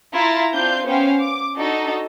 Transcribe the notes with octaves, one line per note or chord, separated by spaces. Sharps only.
E4 F4 A#5 A6
C4 D4 F4 F5 G6
B3 C#4 C5 F5 G5
D6
D4 D#4 F#4 A4 D#5